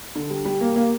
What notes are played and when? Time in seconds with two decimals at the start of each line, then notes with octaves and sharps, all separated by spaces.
0.15 D3
0.30 G3
0.45 G3
0.61 A#3
0.76 A#3